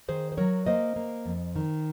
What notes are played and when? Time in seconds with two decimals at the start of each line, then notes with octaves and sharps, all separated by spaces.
0.08 D#3 G#4 C5
0.32 C5
0.38 F#3 A#4 C#5
0.66 A#3 C5 D#5
0.96 A#3
1.26 F2
1.56 D#3